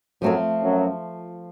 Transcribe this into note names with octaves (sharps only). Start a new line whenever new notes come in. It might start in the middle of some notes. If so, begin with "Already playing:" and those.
F#2 F3 F#3 A3 C4 F4
F#2 F#3